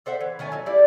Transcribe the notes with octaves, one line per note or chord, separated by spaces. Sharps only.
A4 C5 E5 F#5
E3
D#3 A3 C#4 G#5
F#3 E4
G3 A3 E4 D5